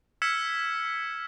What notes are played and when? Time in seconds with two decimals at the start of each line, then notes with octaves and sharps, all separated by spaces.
0.22 E6 F6 G#6 B6 C#7 E7